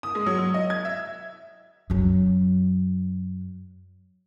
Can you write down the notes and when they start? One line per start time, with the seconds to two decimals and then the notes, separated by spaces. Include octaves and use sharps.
0.03 D#6
0.15 G#3
0.26 F#3
0.38 F#3
0.54 D#5
0.70 G#6
0.85 E5
1.90 F#2 F#3